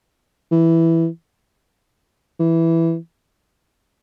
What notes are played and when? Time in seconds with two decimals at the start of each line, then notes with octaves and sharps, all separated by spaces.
0.51 E3
2.40 E3